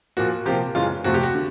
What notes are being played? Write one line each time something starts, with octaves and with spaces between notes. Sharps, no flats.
A#2 F3 A#3 F#4
C3 F3 A#3 G4
F#2 C#3 E3 G#3 F4
F2 C3 F3 A3 F#4
G4
F#4
D3